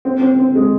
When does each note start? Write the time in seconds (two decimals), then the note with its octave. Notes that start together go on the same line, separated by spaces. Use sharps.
0.05 C4
0.22 C4
0.39 C4
0.55 G#3